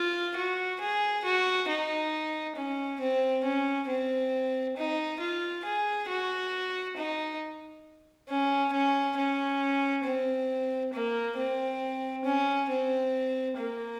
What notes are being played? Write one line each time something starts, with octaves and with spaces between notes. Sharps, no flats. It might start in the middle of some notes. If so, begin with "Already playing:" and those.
Already playing: F4
F#4
G#4
F#4
D#4
C#4
C4
C#4
C4
D#4
F4
G#4
F#4
D#4
C#4
C#4
C#4
C4
A#3
C4
C#4
C4
A#3